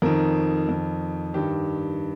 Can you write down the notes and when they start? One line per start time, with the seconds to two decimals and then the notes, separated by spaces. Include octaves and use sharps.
0.02 F2 D#3 A#4
0.69 F2 D#3
1.34 G2 D#3 G4